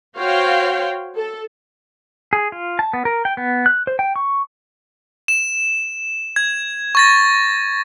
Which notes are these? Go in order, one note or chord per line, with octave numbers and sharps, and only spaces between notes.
F#4 C5 C#5 F5 G5
A4
G#4
F4
A5
B3
A#4
G5
B3
F#6
C5
G5
C#6
E7
G#6
C#6 A6 A#6